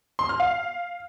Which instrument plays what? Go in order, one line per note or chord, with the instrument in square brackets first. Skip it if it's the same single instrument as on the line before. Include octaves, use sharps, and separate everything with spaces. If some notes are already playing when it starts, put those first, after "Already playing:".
[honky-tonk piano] C6
F6
F5